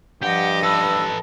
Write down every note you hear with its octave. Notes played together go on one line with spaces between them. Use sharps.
G2 F3 G4 D#5 F#5
A4 B4 E6